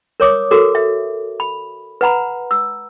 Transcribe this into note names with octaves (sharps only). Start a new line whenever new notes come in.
A#4 C#5 D6 D#6
F#4 A4 A#4 D6
E5
B5
B4 F#5 A#5 B5
E6